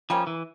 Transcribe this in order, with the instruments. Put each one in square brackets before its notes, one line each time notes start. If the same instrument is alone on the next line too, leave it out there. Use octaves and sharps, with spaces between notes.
[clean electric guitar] F3 [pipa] G3 A#3 C#4
[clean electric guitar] E3